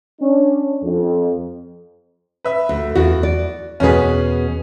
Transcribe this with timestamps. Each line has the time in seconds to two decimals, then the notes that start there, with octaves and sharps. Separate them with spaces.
0.21 C#4 D4
0.83 F2
2.45 B4 E5
2.69 D2
2.95 E2 F#4
3.23 D5
3.80 E2 B2 C#4 G#4 B4